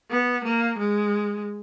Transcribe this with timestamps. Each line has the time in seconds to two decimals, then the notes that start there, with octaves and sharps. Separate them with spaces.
0.10 B3
0.44 A#3
0.78 G#3